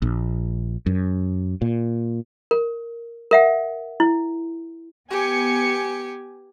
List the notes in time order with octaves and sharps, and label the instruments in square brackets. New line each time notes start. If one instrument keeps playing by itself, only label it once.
[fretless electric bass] A#1
F#2
A#2
[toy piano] A#4
A#4 E5 F#5
E4
[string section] B3 G#5 C#7 [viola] G4